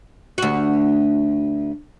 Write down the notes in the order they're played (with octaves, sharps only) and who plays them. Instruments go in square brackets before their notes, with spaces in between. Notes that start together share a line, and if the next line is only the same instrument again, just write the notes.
[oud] D2 F#4